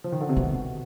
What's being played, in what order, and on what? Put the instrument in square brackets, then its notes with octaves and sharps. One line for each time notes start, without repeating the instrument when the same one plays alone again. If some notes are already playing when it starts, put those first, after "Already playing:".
[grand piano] F3
D#3
D3
C3
[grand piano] B2 [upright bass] D#3